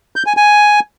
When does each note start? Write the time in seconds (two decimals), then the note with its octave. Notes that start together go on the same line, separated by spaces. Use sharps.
0.16 G6
0.26 G#5
0.37 G#5